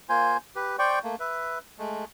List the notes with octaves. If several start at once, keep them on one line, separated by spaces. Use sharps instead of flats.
A#3 F4 C5 G#5
G4 B4
C5 D5 G5 C#6
A3 A#3
B4 E5
G#3 A3